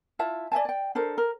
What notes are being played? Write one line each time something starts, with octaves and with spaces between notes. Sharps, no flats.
E4 F4 E5 A5
D5 E5 G#5 A5
D5 G5
D4 A4 A#4 C5
A#4